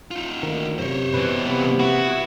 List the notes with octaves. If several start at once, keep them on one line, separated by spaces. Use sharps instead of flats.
D#4 F4
D2 D#3
F#2 C3 C5 C#5
B2 E3 B4
G2 C3 B3
B3 E4 F#4